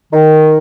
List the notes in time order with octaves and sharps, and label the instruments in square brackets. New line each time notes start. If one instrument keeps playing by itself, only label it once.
[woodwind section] D#3